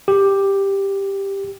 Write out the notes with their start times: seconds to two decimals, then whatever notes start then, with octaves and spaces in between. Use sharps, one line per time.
0.08 G4